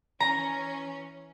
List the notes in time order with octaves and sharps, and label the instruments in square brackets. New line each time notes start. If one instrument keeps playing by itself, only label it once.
[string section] E3 C#4 [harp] A#5